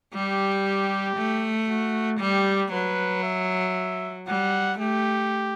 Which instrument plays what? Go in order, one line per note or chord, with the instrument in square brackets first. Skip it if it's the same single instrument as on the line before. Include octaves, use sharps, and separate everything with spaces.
[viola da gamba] G3 [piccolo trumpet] G4
[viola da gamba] A3
[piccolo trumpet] F#4
[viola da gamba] G3 [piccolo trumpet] G4
[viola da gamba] F#3 [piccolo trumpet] B4
[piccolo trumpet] E5
[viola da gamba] G3 [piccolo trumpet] F#5
[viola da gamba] A3 [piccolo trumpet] G4